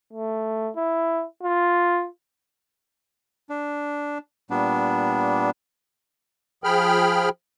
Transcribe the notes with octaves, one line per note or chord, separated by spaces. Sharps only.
A3
E4
F4
D4
A#2 G3 B3 D4
F3 G#4 G5 B5 F6